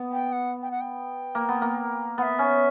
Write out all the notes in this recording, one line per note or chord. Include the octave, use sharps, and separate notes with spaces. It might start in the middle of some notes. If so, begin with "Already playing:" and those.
Already playing: B3
G5
F#5
G5
F#5
G5
A#3
B3
A#3
B3 E5 F#5
C#4